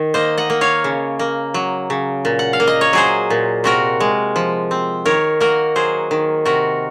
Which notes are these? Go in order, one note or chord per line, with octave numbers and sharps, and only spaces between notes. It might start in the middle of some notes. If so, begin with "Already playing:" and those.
Already playing: D#3
A#3 C5 D#5
D#5 F#5
A#3
C#5 F5
C#3
A#3
F#3
C#3
A#2
F#5
F5
A#3
D#5
C#5
F#3 G#4 C5
A#2
C3 F#4 A#4
G#3
F3
C4
D#3 A#4 C#5
A#3 F#4 A#4
F#3 G#4 C5
D#3
C3 F#4 A#4